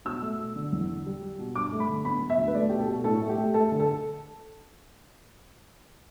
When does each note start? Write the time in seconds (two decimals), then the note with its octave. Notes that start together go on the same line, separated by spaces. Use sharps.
0.05 B2 E6
0.22 A3
0.39 B2
0.56 D3
0.72 E2
0.89 D3
1.06 G3
1.22 G3
1.39 B2
1.55 G2 D6
1.72 A3
1.80 B5
1.88 D3
2.05 B3 B5
2.21 B3
2.30 E5
2.38 D2
2.47 B4
2.54 A3 D5
2.69 B2 G4
2.79 A4
2.88 B2
3.04 A2 A4
3.22 A3
3.29 G4
3.38 A3
3.54 A3 A4
3.72 D3
3.80 A4